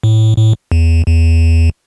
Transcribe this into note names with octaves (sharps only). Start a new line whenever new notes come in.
A2
A2
E2
E2